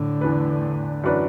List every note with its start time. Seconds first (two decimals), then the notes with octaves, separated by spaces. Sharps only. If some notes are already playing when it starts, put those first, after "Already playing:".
Already playing: A2 D3
0.21 E2 E3 D4 B4
1.04 F#2 E3 D4 F#4 B4